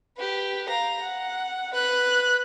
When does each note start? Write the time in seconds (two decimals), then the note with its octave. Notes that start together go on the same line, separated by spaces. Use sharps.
0.17 G4 B4
0.69 F5 A#5
1.01 F#5
1.74 B4 F#6